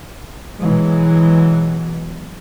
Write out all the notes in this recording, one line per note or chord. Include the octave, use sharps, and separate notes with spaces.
B2 E3 F#3 G#3